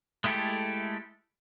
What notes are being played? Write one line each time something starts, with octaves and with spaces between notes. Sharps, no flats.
G#3 A3 E4 G4 A4